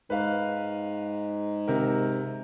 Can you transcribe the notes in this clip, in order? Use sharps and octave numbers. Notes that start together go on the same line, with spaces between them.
G#2 B4 F5
C3 A#4